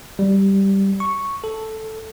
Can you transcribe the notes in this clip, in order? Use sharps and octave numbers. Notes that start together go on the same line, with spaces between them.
G3
C#6
A4